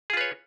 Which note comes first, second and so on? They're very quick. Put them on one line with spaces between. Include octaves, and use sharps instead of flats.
G#4 F4 B4 C#5